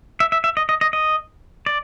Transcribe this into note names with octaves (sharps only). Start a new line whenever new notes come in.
E5
E5
E5
D#5
D#5
D#5
D#5
D5